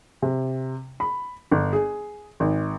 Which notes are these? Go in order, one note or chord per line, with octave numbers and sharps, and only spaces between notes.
C3
B5
G1
G#4
G#1